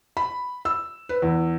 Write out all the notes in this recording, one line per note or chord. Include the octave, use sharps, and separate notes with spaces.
B5
E6
B4
E2